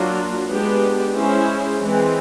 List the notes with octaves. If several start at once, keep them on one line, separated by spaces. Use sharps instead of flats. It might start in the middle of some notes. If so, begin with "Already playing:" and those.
Already playing: F#3 A#3 D4 F4
G#3 B3 D4 G4
G#3 C#4 E4 G#4 C5
E3 G#3 C4